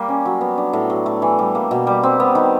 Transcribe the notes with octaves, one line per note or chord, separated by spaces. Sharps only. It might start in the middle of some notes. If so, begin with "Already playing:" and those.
Already playing: G3 A#3
C#4
F#3
B3
D4
A2
F#3
A3
E3
G3
A#3
B2
G3
C4
B3
D#3